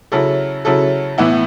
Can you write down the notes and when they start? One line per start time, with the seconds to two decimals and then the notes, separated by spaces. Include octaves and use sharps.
0.12 C#3 F#3 C#4 E4 A4
0.65 C#3 F#3 C#4 E4 A4
1.18 A2 E3 B3 E4